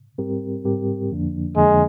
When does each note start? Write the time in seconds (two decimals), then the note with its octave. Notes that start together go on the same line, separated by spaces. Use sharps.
0.18 G#2 G3 C4 G4 A#4
0.65 G#2 G3 C4 G4 A#4
1.11 F2 D3 F3 A#3 D4
1.56 F2 D3 F3 G#3 A#3 D4